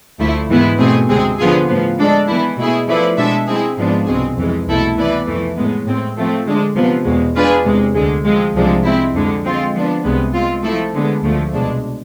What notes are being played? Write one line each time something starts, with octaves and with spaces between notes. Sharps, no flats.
D2 D3 F3 A3 E4
G#2 E3 G#3 B3 E4
B2 A3 C4 G#4
D2 C3 G#3 C4 G#4
D3 F3 B3 F4 G#4
A2 F3 B3
G#3 D4 A4 D5
E3 B3 E4
B2 A3 E4 G#4
F3 A3 E4 B4 D5
B2 G#3 D4 A4 E5
G#3 C4 E4 G#4
G#2 F3 G#3 B3 D4
C2 B2 G#3 C4 G#4
F2 E3 G#3
C2 B2 A3 E4 A4
E3 B3 E4 B4 D5
F2 E3 A3
A2 G#3 B3
A2 G#3 C4
F3 A3 C4
D3 G#3 D4
C3 F3 B3
E2 B2 G#3
G#3 D4 F4 G#4 B4
E2 C3 G#3
D2 D3 G#3
F3 G#3 C4
C2 C3 F3 G#3 D4
G#3 C4 E4
F2 D3 G#3
G#3 C4 F4
F3 B3 D4
C2 C3 G#3 B3
G#3 C4 F4
F3 A3 E4 A4
D3 G#3 B3
D2 D3 F3 A3
C2 B2 G#3 D4